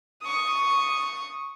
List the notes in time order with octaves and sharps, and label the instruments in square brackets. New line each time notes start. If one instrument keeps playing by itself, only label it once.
[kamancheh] C#6 D#6